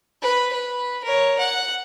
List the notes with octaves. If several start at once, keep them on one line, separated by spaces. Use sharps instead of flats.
B4
B4
A#4 C#5
F#5